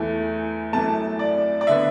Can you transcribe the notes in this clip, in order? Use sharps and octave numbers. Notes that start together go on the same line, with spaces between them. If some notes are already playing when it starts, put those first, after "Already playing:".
Already playing: E2 E3 A3
F#2 E3 A3 A5
D5
D5
D3 B3 E5